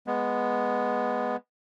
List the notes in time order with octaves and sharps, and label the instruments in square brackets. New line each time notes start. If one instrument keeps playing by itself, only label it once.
[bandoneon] G#3 B3